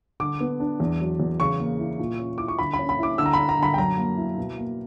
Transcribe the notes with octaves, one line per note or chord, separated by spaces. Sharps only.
D3 D6
B3
D4
E2
F#3
E2
C#3 C#6
A#3
E4
A#2
C#4
E4 D6
C#6
D3 B5
B5
C#4
B5
E4 D6
D3 E6
A#5
D4 B5
A#5
D3 B5
G5
F#2 A#5
A#3
E4
B2
A#3